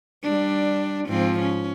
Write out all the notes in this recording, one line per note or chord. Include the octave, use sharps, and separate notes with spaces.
G3 D4
G#2 F3 C4
C#4